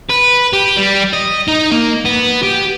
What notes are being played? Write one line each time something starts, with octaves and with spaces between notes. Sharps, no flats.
B4
G4
G3
D#5
D#4
A#3
B3
G4